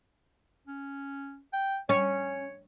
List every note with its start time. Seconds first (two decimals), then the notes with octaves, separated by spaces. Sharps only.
0.67 C#4
1.53 G5
1.89 C#4 C#5